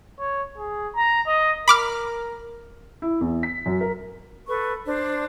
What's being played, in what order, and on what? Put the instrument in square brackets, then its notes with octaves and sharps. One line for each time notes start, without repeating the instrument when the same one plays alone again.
[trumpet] C#5
G#4
A#5
D#5
[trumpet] A#4 [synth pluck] B5 D6 F6
[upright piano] E4
E2
B6
F#2
A#4
[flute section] A4 B4 C#6
D4 C5